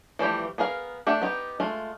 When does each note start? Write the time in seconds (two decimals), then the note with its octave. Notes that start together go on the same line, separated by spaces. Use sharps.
0.19 E3 F3 G3 A3 G4
0.58 B3 G#4 A#4 F5
1.07 A3 D4 G4 E5 F#5
1.22 B3 D#4 G4
1.60 G#3 A3 F4